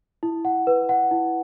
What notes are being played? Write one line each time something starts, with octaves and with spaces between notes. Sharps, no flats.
E4
F#5
B4
F#5
E4